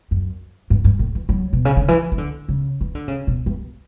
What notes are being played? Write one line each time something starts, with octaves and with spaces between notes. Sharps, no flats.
F#2
G2
G2
A2
E3
F#3
B2
C#3
D3
E3
E3
D3
C#3
E3
D3
C#3
B2
G2